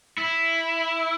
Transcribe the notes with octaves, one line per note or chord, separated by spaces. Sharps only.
E4